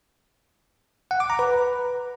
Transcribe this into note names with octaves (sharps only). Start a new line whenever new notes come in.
F#5
D6
A#5
B4